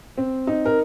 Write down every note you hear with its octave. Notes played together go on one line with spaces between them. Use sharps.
C4
D#4
A#4